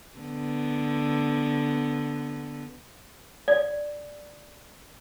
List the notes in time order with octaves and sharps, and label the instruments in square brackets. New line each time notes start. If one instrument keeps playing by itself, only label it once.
[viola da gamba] D3 B3
[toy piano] D5